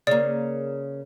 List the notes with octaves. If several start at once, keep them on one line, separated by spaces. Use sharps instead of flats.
C#3 A#3 D5